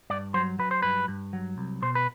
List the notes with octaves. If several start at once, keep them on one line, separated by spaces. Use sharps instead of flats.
G2 D5
F#3 C5
F#3 B4
C5
G2 B4
G2
F#3
C2
B2 C5
B4